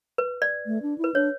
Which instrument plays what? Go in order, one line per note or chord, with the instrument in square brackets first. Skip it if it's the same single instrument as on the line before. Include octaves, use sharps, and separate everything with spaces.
[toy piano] B4
D5
[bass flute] A3
D4
E4
[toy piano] B4
[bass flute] D4 [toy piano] C#5